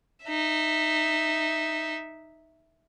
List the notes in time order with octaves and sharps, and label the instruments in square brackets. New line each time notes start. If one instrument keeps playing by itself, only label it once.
[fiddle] D#4 E5